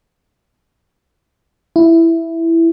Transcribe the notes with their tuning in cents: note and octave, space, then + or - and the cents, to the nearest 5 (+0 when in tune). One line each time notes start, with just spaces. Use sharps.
E4 +5